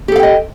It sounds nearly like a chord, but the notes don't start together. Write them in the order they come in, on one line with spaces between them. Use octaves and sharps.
G4 A4 F5 G5 D#5